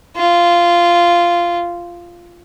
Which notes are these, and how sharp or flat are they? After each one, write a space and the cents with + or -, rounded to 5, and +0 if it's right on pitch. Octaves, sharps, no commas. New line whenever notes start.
F4 -10